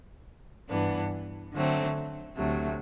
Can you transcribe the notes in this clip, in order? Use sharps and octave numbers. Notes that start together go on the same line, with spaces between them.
G2 E3 B3 D4
D3 F#3 A3 C4
D2 C3 F#3 A3